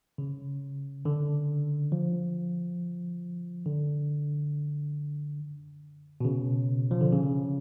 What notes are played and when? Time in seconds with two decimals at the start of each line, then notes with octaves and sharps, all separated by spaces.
0.18 C#3
1.05 D3
1.92 F3
3.66 D3
6.20 B2
6.25 C#3
6.91 F3
7.01 D3
7.12 C#3